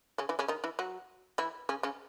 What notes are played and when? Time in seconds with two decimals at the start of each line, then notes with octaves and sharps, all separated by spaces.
0.18 C#3 C#4
0.29 E3 E4
0.39 C#3 C#4
0.48 D#3 D#4
0.64 E3 E4
0.79 F#3 F#4
1.38 E3 E4
1.69 C#3 C#4
1.83 C#3 C#4